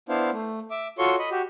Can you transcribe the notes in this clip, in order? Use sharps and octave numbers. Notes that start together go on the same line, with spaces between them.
B3 D4 E4 C5 F5
A3
E5 D6
F4 F#4 A4 C#5 C6 C#6
D#5 B5
F#4 G4